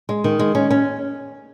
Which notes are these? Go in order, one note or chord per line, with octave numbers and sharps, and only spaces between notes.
G#3
D#3
G#3
C#4
C#4